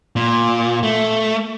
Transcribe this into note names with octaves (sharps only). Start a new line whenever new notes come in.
A#2
A3